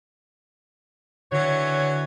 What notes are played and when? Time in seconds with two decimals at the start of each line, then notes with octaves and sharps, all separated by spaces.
1.31 D3 E3 F#3 C#5